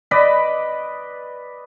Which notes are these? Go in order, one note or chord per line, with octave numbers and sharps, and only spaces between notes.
B4 D5 D#5 B5